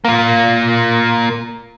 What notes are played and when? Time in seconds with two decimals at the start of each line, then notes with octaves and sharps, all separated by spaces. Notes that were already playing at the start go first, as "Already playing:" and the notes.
0.05 A#3 F4